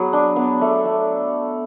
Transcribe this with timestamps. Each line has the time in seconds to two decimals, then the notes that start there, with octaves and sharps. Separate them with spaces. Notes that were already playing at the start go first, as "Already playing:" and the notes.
Already playing: F#3 B3 G#4
0.13 D4
0.36 B3
0.61 A3
0.85 A3